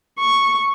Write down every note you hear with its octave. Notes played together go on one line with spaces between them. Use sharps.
C#6